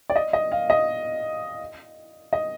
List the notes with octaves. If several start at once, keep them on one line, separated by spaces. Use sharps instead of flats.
D5
D#5
D#5
F5
D#5
D#5